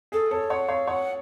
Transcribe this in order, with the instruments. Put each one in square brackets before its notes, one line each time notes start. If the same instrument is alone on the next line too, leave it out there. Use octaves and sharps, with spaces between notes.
[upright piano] G#4 [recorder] A4
[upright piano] A4 [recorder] C#5
[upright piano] C#5 [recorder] F#5
[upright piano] C#5 [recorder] F5
[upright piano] C#5 [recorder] F#5